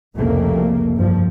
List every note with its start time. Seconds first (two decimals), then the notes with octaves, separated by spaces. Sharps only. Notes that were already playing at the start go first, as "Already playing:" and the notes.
0.15 F1 C2 F2 C#3 A3 A#3
0.95 G2 F3